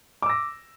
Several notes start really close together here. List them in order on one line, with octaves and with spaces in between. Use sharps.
D6 E6 A#6